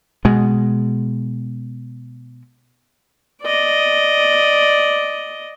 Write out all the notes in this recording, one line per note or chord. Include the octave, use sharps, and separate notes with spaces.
B2 G#3
D5 D#5